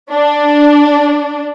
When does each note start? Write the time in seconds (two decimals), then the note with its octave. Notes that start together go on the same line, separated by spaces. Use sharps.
0.11 D4